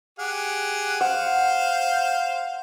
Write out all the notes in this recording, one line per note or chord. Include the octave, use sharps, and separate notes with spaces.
G4 G#4 F#5
C5 F5 F#5